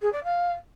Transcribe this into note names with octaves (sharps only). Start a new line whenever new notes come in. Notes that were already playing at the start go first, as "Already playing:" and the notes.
G#4
D5
F5